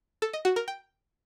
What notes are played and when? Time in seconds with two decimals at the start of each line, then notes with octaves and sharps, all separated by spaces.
0.22 A4
0.33 D#5
0.45 F#4
0.56 A#4
0.68 G5